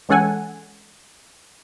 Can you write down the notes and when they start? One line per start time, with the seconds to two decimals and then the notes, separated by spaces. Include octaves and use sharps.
0.09 E3 G#3 C#4 A4 F#5 G#5